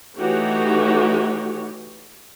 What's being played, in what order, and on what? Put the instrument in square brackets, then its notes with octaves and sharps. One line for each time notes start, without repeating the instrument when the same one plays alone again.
[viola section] E3 A3 D#4 F#4 G4 C#5